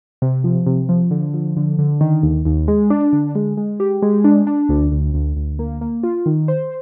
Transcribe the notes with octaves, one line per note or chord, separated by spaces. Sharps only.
C3
F3
C3
F3
D3
F3
D3
D3
D#3
D#2
D#2
G#3
D4
D3
G#3
G#3
G4
G#3
D4
D4
D2
D2
D2
D2
A#3
A#3
F4
D#3
C5